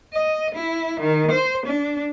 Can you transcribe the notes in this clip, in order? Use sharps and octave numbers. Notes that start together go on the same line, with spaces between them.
D#5
E4
D#3
C5
D4